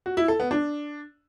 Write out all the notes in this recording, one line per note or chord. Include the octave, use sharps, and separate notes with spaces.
F#4
E4
A4
B3
D4